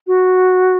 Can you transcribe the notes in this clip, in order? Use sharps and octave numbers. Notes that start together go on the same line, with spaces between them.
F#4